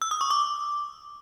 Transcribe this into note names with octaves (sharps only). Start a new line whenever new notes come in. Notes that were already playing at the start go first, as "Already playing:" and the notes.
E6
D#6
C#6
D6